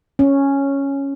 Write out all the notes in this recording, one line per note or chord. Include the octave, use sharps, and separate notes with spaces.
C#4